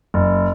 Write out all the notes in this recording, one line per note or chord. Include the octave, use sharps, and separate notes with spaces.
F#1